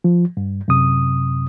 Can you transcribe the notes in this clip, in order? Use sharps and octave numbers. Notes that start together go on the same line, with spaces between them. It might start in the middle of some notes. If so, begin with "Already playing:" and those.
F3
G2
F#2 C3 D#6